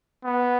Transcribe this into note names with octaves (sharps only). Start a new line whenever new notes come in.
B3